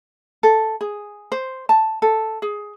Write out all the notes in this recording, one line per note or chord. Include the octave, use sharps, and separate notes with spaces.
A4
G#4
C5
A5
A4
G#4